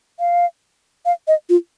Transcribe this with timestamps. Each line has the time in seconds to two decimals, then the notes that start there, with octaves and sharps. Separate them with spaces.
0.20 F5
1.06 F5
1.28 D#5
1.49 F4